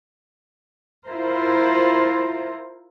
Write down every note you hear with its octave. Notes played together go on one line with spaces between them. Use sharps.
E4 F4 A#4 C5